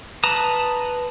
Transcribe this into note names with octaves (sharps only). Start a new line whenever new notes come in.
B4 A5 A#5 D#6